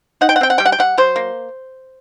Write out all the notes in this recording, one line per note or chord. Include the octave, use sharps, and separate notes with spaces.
D#4 F#5
G5
F#5
C4 G5
F#5
G3 G5
F#5
G5
G3 F#5
F#3 C5
A#3